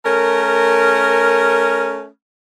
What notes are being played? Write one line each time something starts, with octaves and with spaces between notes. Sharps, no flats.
A3 C#4 A#4